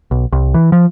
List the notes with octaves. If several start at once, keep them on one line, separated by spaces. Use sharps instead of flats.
B1
C2
E3
F3